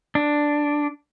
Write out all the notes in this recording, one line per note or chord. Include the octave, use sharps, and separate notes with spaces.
D4